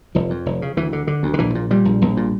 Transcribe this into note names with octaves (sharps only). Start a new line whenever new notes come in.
F1 F3
F2
F1
C#3
D2 E3
D3
D3
D2
D3
A#1 E3
A#2
A#2 G3
A#1
A#1
A#2